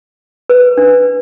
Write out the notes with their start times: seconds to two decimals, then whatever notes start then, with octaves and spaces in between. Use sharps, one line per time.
0.49 B4
0.77 D4